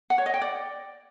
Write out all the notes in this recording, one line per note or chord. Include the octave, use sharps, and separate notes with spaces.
F#5
C#5
D#5
G5
D5